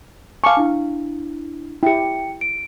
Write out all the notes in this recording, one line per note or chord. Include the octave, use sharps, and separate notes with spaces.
F5 G#5 A5 C#6 D6
D4 E4
E4 G4 G5 C#7
D7